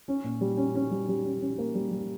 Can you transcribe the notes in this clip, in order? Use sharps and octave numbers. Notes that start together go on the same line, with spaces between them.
C#4
A#2
G3
C#4
C#4
G3
G3
C#4
C#4
A#3
G3
G3